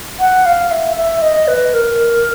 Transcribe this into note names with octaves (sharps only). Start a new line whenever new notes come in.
F#5
F5
E5
E5
D#5
B4
A#4